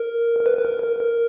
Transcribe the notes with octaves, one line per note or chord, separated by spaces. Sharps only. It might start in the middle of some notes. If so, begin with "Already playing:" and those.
Already playing: A#4
A#4
B4
B4
A#4
A#4
A#4